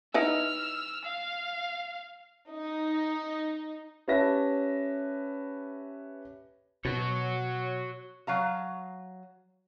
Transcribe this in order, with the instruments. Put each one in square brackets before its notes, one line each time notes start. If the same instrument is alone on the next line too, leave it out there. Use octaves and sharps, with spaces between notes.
[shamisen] D#4 E4 B4 [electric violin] E6 F6
[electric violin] F5
[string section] D#4
[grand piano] C#4 G4 B4 E5 A5 A#6
[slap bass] B2 [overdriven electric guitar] F#4 C#5
[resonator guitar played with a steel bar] F#3 F5 A#5